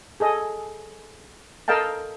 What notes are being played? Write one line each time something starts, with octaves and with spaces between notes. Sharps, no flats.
G#4 A4 D#5
A4 A#4 D#5 F5 G5 A5